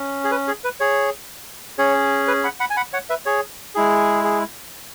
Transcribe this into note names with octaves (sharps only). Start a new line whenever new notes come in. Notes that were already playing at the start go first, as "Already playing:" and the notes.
Already playing: C#4
G#4
B4
G#4
B4
G#4 C#5
C#4 G#4 C#5
B4
F#5 B5
F#5 B5
G#5
F#5 B5
C#5 F#5
B4 E5
G#4 C#5
G#3 E4 G#4
G#4